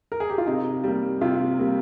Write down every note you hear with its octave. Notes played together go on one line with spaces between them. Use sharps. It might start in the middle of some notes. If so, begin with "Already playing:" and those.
A#4
G#4
G4
F4
C3 D#4
G3 A#3
C3 F4
G3 A#3